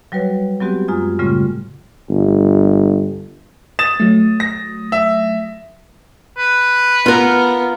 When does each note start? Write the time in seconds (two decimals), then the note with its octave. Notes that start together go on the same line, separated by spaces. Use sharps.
0.12 F#3 G3 F#4 B4 C#5
0.60 F#3 G#3 B3 C4 F#4 G4
0.88 F#2 G#3 F4 G#5 D#6 G#6
1.19 A2 C#3 G3 A3 C4 F4
2.10 G1
3.79 D#6 A6 E7
4.00 F#3 A3
4.40 A#6
4.92 E5
6.37 B4
7.06 B3 F4 A#4